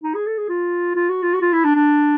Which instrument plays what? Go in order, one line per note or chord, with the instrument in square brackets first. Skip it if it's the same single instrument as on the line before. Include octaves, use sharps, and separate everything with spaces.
[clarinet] D#4
G#4
A4
G#4
F4
F4
F#4
F4
F#4
F4
E4
D4
D4